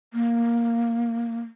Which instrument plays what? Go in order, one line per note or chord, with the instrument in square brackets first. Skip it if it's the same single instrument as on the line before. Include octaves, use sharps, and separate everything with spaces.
[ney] A#3